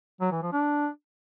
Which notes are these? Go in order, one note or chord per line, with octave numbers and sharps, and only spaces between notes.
F#3
E3
F3
D4